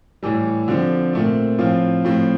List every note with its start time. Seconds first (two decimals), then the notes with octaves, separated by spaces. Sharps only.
0.23 A2 E3 G3
0.68 D3 F3 C4
1.13 A#2 A3 C4
1.59 A2 F3 C4 F4
2.05 A2 F3 C4